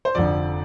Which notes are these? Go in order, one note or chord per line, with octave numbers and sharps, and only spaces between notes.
C5
F1 F2 D3 F3 D5